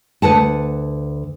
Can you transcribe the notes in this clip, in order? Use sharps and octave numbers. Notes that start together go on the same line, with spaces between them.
D2 B4 F#5 A5